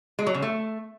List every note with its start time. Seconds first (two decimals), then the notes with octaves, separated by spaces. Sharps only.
0.19 G#3
0.27 F#3
0.34 C#3
0.42 A3